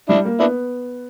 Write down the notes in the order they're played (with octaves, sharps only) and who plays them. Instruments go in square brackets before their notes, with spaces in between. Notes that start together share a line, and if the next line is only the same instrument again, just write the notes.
[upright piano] G3 [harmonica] D4 E4
[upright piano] A#3
[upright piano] B3 [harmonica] D4 E4